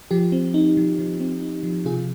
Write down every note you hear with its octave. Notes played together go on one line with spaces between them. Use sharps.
F3 G4
C4
D#4
F3
F3
C4
D#4
F3
C3 F4 G#4